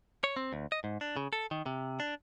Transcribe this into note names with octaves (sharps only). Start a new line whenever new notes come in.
C#5
C4
D2
D#5
G#2
D4
C#3
A4
D#3
C3
D4